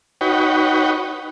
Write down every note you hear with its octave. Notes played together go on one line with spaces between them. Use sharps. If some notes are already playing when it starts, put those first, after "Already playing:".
D#4 F#4 B4 C#5 G5